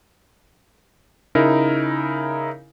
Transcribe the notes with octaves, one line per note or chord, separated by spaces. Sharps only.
C#3 D#4 E4 A#4